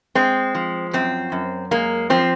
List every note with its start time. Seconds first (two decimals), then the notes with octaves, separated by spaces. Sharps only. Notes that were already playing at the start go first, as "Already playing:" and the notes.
0.15 G#3 C4
0.55 F3
0.93 F#2 C4
1.32 F#2
1.71 G#3 A#3
2.10 F3 C4